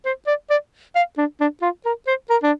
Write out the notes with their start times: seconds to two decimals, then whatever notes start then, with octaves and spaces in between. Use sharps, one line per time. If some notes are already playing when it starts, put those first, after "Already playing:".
0.05 C5
0.27 D5
0.50 D5
0.95 F5
1.18 D4
1.40 D4
1.62 F4
1.85 A#4
2.07 C5
2.30 A#4
2.43 D4